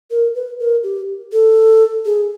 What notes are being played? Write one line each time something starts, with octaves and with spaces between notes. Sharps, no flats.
A#4
B4
A#4
G4
A4
G#4